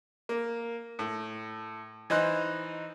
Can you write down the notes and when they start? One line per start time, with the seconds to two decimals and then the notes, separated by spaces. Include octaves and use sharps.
0.29 A#3
0.99 A2
2.10 E3 D#4 C5 F#6